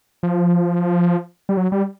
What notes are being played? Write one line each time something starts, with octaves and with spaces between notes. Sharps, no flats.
F3
G3
F#3
G3